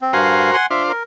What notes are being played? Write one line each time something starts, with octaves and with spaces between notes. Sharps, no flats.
C4
G2 F#4 A#4 C5 F5 G#5
F#5 G#5 C6
D4 F4 C5 E5
A#4